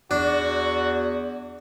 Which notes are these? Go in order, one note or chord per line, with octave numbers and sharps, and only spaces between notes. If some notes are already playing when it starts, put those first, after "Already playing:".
E2 D4 F#4